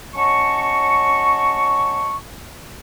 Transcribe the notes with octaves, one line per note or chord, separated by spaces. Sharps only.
F#3 C#4 D#5 A5 C#6